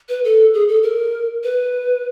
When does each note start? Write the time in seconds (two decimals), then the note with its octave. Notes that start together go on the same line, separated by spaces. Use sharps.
0.09 B4
0.24 A4
0.54 G#4
0.68 A4
0.83 A#4
1.44 B4